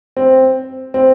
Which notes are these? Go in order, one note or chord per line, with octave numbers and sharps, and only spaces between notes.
C4
C4